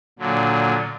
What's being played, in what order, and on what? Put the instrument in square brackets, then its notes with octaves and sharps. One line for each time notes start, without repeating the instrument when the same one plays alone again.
[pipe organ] A#2 D3 F#3